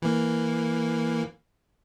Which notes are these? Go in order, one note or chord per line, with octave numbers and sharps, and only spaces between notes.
E3 A#3